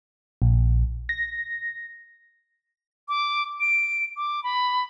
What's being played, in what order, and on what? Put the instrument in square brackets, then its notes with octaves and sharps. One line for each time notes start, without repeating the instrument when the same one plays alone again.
[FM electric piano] A#1
A#6
[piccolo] D6
D7
D6
B5